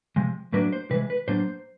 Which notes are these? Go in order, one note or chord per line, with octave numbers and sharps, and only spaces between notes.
C3 F3 G#3
A2 F#3 A#3 D4 B4
C5
C3 E3 G#3 B4
B4
A2 F#3 A#3 D4 C5